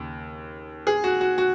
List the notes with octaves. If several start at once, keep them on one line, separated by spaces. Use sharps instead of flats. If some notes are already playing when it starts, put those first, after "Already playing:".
Already playing: D#2 C#3
G#4
F#4
F#4
F#4